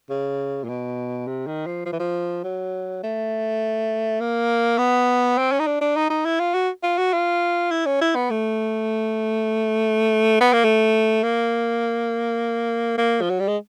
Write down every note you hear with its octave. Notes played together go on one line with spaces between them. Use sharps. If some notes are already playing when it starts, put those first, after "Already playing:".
C#3
A#2
B2
C3
D#3
F3
F3
E3
F3
F#3
A3
A#3
B3
C4
C#4
D#4
D4
D4
D#4
D#4
E4
F4
F#4
F4
F#4
F4
E4
C#4
E4
B3
A3
B3
A#3
A3
A#3
A#3
F3
F#3
G3
G#3